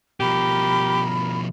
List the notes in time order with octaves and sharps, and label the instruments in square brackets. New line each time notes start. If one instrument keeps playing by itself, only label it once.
[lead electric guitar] B2 F3 [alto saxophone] G4 [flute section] A#4 B5